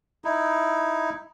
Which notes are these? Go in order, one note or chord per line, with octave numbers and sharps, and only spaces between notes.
D#4 E4